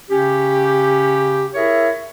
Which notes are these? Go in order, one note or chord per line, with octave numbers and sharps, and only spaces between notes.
C#3 C#4 G4
E4 G#4 A#4 C#5 E5